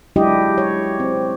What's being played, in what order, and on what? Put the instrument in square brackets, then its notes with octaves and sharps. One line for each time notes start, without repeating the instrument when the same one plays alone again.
[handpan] F#3 G#3 D4 E4 G4 D#5
C#5
C4